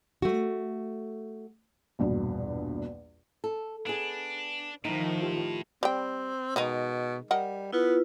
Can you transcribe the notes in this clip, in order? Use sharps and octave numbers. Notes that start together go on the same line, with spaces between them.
A3 F#4
A#1 E2 G2 B2
A4
B3 D4 G#4
A2 D#3 F3 D#4
F4 G4
G3 C4 G5
B2 D#3 G#3 D#4
G3 A#4 D#5 F#5
B3 E4 F4 B4